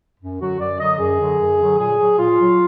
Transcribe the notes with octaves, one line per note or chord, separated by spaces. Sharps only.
F#2
D3 F#3 F#4
F#2 D5
D3 F#3 D#5
F#2 G#4
D3 F#3
F#2
D3 F#3
A#2 G#4
F#3
A#2 F4
F#3